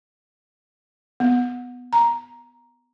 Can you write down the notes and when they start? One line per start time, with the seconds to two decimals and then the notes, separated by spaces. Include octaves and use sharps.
1.20 B3
1.93 A#5